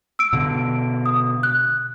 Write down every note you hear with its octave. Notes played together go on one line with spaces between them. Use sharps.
E6 D7
B2 D3
D#6
F#6